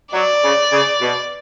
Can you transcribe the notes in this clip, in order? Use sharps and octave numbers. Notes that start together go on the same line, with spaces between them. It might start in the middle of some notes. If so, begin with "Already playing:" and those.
F#3 D5
C#3
C#3
B2